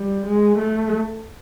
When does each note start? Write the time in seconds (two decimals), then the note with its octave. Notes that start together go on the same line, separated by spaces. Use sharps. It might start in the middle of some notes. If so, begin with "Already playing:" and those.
Already playing: G3
0.26 G#3
0.58 A3